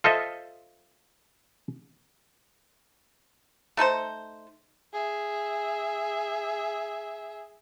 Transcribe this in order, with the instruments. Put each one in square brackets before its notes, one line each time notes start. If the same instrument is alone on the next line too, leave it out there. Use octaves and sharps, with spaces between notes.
[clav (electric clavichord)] F4 A4 C5 D#5 E5
[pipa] A3 D#4 A4 C5
[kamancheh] G#4 E5